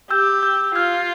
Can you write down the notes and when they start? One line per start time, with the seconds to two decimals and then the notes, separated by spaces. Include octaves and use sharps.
0.10 G4 E6 G6
0.43 E6 G6
0.75 F4 F6 G#6